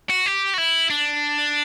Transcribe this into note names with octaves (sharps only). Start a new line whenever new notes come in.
F#4
G4
F#4
E4
D4